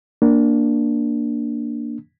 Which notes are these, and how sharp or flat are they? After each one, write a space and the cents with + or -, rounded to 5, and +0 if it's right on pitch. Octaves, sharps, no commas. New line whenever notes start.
A#3 +0 D4 +0